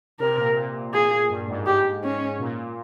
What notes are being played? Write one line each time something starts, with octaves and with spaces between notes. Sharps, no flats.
C3 A#4
A#2
A#2
G#4
G2
G#2
G4
C#4
A#2